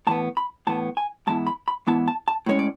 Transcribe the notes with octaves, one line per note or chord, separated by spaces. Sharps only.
A2 E3 B3 A5
B5
A2 E3 B3 A5
G#5
G#2 E3 B3 E4 A5
B5
B5
G#2 E3 B3 E4 A5
A5
A5
A2 G#3 C#4 C#5
D5